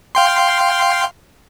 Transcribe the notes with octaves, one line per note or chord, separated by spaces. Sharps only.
F5 G5 C6